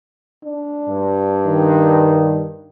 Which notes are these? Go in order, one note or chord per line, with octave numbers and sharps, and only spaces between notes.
D4
G2
D#3